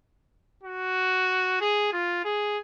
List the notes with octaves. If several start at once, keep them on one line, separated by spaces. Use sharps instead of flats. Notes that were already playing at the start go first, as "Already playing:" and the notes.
F#4
G#4
F4
G#4